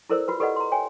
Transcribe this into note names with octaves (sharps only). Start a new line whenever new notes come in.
E4 A4 A#4 C5 D5 E6
F4 F#4 B4
G4 A4 B4 D5 D#5 F#5
A#5 C6
C#5 G5 G#5